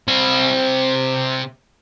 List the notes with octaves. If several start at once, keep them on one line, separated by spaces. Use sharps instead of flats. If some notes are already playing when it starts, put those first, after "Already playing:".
C3 B5